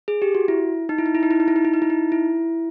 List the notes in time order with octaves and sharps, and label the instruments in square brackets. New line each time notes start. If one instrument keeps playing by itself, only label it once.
[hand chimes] G#4
G4
F#4
E4
D#4
E4
D#4
E4
D#4
E4
D#4
E4
D#4
E4
D#4
E4
D#4
E4